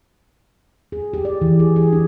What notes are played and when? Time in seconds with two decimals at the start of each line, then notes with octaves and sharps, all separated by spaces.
0.92 G#4
1.13 G4
1.25 D5
1.42 E3
1.59 G#4
1.76 G#4
1.93 D4